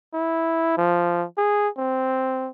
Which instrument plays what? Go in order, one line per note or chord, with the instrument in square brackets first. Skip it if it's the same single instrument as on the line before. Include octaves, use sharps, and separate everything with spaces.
[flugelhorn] E4
F3
G#4
C4